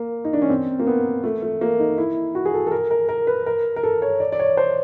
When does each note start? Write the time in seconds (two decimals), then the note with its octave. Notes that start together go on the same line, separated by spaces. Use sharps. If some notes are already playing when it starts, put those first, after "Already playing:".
Already playing: A#3
0.25 D#4
0.33 D4
0.42 C#4
0.50 C4
0.80 A#3
0.87 B3
1.24 A3
1.42 A3
1.61 A#3
1.80 D#4
1.98 E4
2.35 F#4
2.45 G#4
2.54 A4
2.67 A4
2.72 A#4
2.91 A#4
3.09 A#4
3.27 B4
3.46 A#4
3.76 A#4
3.83 A4
4.02 C#5
4.20 D5
4.32 D5
4.40 C#5
4.57 C5